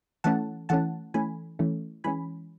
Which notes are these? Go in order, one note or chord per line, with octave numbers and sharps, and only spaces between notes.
E3 A3 C#4 F#5 A5
E3 A3 C#4 F#5 A5
E3 A3 C#4 G#5 B5
E3 A3 C#4
E3 G#3 C#4 G#5 B5